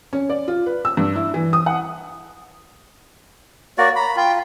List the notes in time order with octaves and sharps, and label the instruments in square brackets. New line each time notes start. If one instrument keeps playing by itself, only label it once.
[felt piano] C#4
D5
F4
B4
E6
G2
E4
E3
D#6
F#5
[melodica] A#3 F#4 D5 [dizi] C#5
[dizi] A#5 [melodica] B5
[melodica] F4 [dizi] G5